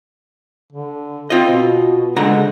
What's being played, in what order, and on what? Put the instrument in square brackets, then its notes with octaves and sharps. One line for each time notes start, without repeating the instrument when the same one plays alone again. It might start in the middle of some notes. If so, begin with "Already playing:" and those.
[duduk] D3
[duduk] C4 [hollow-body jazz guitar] F4 D#5
[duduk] B2
[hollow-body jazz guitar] C#2 D3 A#5 [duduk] G#3